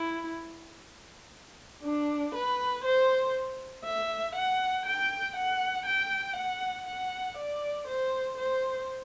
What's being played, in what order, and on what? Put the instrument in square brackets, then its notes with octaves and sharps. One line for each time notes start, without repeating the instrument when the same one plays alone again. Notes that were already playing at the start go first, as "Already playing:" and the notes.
Already playing: [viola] E4
D4
B4
C5
E5
F#5
G5
F#5
G5
F#5
F#5
D5
C5
C5